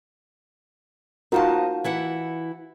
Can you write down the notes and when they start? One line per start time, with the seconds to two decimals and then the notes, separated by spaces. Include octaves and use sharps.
1.32 D#4 F4 F#4 A#4 C5 A5
1.84 E3 E4 F#5